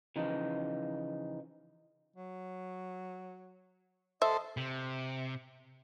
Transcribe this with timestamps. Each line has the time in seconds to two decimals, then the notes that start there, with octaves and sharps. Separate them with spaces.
0.16 C#3 E3 F3 D#4
2.16 F#3
4.22 A4 C5 D#5 E5
4.57 C3